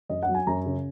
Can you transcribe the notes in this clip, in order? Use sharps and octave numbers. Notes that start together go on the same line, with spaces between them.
F#2 D#5
F#5
F#3
G#5
F#2 A#5
C#3